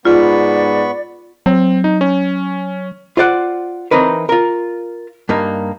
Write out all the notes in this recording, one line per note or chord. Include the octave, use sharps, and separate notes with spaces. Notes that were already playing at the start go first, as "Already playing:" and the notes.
G#2 B3 F4 D5 B5 C#6
F#3 C4
D#4
C#4
F4 C5 D5 F#5
E3 C4 D#4 A#4 B4
F4 A#4
G2 A#3 D#4